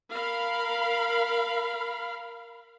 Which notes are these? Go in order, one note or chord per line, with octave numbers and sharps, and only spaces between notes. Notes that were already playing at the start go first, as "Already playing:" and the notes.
A#4 F5 B5